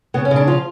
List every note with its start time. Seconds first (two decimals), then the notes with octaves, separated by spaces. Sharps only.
0.14 C#3 B3
0.25 C#4
0.31 C#3
0.36 D4
0.47 F3 F4